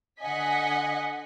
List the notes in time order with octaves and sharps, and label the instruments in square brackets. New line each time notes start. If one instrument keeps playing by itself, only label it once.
[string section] D3 D#5 F#5 G#5 B6